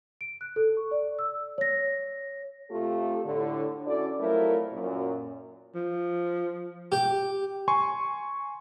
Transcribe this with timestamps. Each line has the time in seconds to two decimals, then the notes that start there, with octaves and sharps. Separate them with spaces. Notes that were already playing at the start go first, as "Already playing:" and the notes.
0.21 D7
0.41 F#6
0.56 A4
0.77 C#6
0.91 D5
1.19 E6
1.58 C#5 A#6
2.70 C3 A3 F4 G4 A4
3.25 A2 D3
3.86 C#4 E4 F#4 A4 D5
4.19 F2 F3 F#3 A3 E4 A#4
4.72 F#2 A#2
5.75 F3
6.92 G4
7.68 G#5 C6 C#6